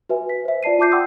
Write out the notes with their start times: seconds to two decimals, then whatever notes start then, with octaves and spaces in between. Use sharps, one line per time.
0.09 F#4 B4 E5 G#5
0.29 B6
0.45 C5 E5
0.63 F4 D5 A5 C7 D#7
0.79 F4 A5 D6 G6 C7
0.92 F#5 G5 C6 D#6 E6